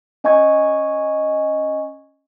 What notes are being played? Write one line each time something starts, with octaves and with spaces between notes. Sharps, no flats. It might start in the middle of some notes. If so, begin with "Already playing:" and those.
C#4 D#5 G#5 C#6 G#6